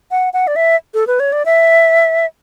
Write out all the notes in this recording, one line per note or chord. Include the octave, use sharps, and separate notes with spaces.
F#5
F#5
D5
E5
A4
B4
C#5
D5
E5